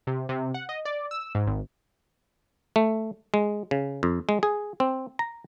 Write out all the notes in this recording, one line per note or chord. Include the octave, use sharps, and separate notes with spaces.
C3
C3
F#5
D#5
D5
E6
G#2
G#1
A3
G#3
C#3
F2
G#3
G#4
C4
A#5